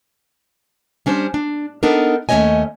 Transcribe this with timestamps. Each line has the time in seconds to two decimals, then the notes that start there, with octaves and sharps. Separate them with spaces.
1.06 G3 C#4 D4 C5
1.34 D4
1.83 B3 D4 D#4 A4 A#4
2.29 D#2 A3 C#4 C#5 D#5 G#5